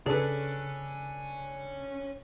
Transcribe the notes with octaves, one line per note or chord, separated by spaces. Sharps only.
C#3 D4 G#4 A4 B4 C#5 G#5